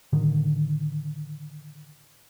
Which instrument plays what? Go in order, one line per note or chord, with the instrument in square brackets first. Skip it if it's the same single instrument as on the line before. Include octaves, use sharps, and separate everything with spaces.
[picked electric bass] A2 D3 D#3